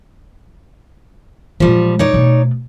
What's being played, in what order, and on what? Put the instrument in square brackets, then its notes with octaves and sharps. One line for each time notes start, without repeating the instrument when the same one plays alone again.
[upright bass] A#2 G#3 [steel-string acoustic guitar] F3 G3
[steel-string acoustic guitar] D#4 C#5 D5
[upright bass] B2 A3